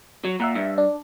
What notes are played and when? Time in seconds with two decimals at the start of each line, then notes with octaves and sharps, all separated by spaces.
0.25 F#3
0.40 A#2 E5 F#5 A#5
0.55 G2 E5
0.78 D4